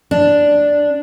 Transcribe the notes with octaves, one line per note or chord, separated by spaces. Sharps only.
D4